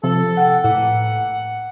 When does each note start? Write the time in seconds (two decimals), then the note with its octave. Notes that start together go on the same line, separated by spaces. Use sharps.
0.04 C3 F3 A4
0.37 F#5 G5 E6
0.64 A2 A#3 B4 F#5